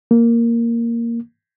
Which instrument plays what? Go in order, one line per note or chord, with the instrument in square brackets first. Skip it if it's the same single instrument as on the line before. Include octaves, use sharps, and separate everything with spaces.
[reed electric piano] A#3